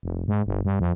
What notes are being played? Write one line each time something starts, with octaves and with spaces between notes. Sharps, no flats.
F1
G#2
G1
G2
F2